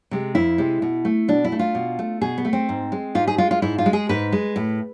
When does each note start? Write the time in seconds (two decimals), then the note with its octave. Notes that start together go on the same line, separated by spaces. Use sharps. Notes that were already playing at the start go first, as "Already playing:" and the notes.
0.11 C3 G#3
0.35 F2 E4
0.58 C3 G#3
0.82 B2
1.05 A3
1.28 B2 D4
1.44 E4
1.52 A3
1.59 F4
1.75 B2
1.99 A3
2.21 B2 G#4
2.38 B3
2.45 A3
2.53 C4
2.69 G#2
2.92 G#3
3.15 G#2 F4
3.27 G#4
3.38 G#3 F4
3.51 F4
3.62 G#2 E4
3.78 F4
3.86 G#3
3.93 G#4
4.09 G#2 B4
4.32 G#3
4.56 A2